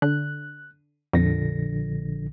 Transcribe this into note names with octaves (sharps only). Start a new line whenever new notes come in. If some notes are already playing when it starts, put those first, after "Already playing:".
D3 F#6
A#1 F2 D3 A#6